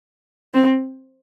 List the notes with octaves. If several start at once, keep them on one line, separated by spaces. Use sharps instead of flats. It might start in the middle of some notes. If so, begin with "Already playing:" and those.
C4